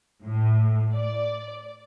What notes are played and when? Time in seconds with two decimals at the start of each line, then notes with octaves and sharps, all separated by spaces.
0.25 A2
0.94 D5